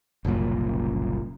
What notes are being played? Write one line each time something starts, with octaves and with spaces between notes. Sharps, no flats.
F#1 C2 F#2 A#2